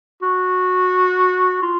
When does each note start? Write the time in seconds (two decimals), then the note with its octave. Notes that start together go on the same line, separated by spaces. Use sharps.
0.22 F#4
1.62 F4